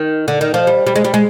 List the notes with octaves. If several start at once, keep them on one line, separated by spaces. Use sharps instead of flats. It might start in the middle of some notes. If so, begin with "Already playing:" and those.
Already playing: D#3
D3
D#3
F3
G3
G3
G#3
G3
G#3